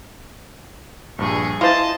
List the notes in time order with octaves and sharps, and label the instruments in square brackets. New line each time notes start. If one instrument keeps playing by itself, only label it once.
[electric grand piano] A#1 G2 [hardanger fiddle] G#4 C#6
[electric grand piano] E4 [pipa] F4 C5 [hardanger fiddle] D#5 A5